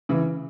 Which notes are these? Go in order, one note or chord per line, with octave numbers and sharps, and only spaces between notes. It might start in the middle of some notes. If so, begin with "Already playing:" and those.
C#3 E3